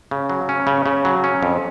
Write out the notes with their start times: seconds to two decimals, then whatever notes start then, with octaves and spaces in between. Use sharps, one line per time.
0.11 C#3
0.30 F#3
0.49 C#4
0.67 C#3
0.86 C#3
1.05 F#3
1.24 C#4
1.43 F2